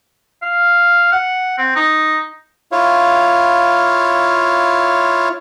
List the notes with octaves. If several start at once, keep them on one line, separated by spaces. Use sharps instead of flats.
F5
F#5
C4
D#4
E4 F4 C#5 F5